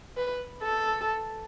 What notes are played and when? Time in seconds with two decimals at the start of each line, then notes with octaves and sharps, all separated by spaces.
0.17 B4
0.63 A4